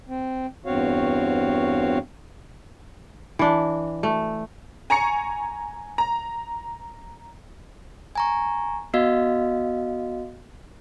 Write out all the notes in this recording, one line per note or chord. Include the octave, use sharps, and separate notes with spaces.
C4
E2 G2 C4 F#4 C#5 F5
E3 D4
A3
G#5 A#5 C#6 C#7
A#5
G#5 A#5 C#6
B3 F#4 D#5 F5